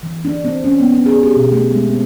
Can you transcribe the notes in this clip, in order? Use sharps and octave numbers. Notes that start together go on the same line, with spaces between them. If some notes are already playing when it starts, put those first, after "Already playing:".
E3
D4
C4
C#4
B3
D4
G#4
G4
B2
A3
G#3
C4